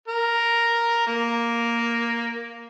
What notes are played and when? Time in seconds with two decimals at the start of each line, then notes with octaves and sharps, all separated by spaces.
0.08 A#4
1.07 A#3